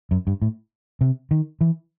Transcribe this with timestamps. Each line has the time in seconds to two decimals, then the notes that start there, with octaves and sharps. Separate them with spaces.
0.11 F#2
0.27 G2
0.42 A2
1.01 C3
1.31 D#3
1.61 E3